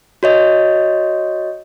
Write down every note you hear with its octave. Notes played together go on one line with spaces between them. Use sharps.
F#4 C#5 D#5